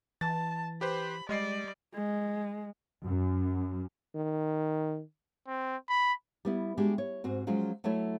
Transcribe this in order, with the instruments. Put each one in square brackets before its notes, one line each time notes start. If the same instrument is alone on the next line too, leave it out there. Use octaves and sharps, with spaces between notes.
[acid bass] E3 [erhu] A5 [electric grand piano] A6
[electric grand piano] G4 B4 C5 [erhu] B5
[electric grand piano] G3 D#5 C7 [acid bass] G#3 [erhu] D5
[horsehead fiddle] G#3
[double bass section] F#2
[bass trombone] D#3
[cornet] C4
B5
[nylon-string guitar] G3 B3 E4
G#3 D4 F#4 G4
C#5
G#2 C4 F#4
F3 F#3 G#3 C#4 F4
F#3 A3 E4 A4 C#5